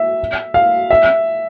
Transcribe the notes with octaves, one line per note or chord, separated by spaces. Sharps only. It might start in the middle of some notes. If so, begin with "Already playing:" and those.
Already playing: E5
F5
E5